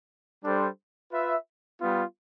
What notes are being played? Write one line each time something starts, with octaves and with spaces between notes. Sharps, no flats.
G3 D4 A4 C5
F4 B4 E5
G3 B3 F4